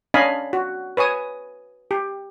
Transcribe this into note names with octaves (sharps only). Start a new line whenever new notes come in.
C#4 D4 D#5 F5 G#5 B5
F#4
B4 C#5 G#5 D#6
G4